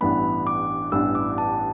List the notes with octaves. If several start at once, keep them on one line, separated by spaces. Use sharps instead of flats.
A1 G2 E3 B3 D4 B5
D6
A1 G2 E3 B3 D4 E6
D6
A5